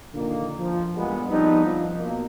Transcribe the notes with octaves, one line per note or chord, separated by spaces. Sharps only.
A#2 D3 D#3 F3 A#3
F3
E2 G2 A#2 G#3 B3
F3 G3 B3 C4 D4 D#4
F3
B2 A#3